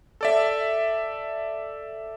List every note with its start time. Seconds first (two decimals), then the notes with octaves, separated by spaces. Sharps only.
0.21 A4 D5 E5